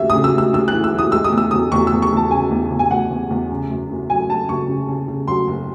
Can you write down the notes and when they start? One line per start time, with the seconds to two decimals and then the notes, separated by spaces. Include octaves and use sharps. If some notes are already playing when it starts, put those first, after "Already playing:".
Already playing: D#2 C#3 E5
0.10 D#6
0.14 C#3
0.24 E6
0.34 D#2 E6
0.53 D#2 E6
0.68 F#6
0.73 E3
0.84 E6
0.94 E3 D#6
1.12 G#3 E6
1.24 D#6
1.32 E2
1.38 E6
1.51 E2 D#6
1.72 E2 C#6
1.87 E6
1.92 E2
2.02 C#6
2.12 E2 A5
2.31 C#3 G#5
2.51 E2
2.71 E2
2.79 G#5
2.91 E2 F#5
3.10 E2
3.31 E2
3.51 C#3
3.70 F#2
3.89 F#1
4.10 F#3 G#5
4.29 F#3 A5
4.49 F#1 C#6
4.68 C#3
4.88 C#3
5.08 C#3
5.28 F#3 C6
5.48 F#1